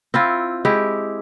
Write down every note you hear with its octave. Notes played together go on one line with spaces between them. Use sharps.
C4 E4 F4
G#3 E4 G4